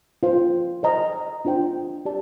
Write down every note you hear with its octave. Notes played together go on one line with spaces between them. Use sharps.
F4 C5 F5
C5 D#5 A#5
D4 F4 C5 G5
G4 D5 A5